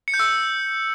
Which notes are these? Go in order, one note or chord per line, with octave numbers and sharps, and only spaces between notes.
C#7
G6
E6